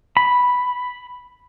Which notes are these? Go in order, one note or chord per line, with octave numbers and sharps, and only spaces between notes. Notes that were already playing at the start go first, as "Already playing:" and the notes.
B5